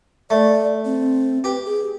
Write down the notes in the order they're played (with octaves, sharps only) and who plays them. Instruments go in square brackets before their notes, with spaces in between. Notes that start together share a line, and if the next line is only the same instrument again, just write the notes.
[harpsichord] A3 [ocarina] D5
[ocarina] C4
[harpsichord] G4 [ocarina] B4
[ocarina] G#4